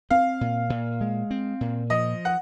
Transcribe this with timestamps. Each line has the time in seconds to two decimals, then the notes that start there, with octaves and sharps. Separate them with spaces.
0.11 C4 F5
0.41 A#2
0.70 A#2
1.01 G#3
1.31 C4
1.61 A#2
1.90 F3 D#5
2.25 F#5